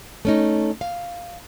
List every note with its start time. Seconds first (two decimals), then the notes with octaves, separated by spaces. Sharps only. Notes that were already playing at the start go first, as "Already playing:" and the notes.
0.25 A3 C#4 D#4
0.81 F5